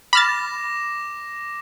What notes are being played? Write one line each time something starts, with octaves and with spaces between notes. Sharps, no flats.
B5 D6 F6 A6 A#6 E7